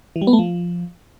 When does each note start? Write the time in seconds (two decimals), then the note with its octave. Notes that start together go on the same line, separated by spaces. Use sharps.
0.16 E3
0.21 G3
0.27 B3
0.33 A3
0.39 F3